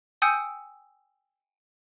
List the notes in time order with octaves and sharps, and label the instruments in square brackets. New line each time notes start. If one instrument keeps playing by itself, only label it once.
[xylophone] G5 G#5 D#6 E6 G6 C#7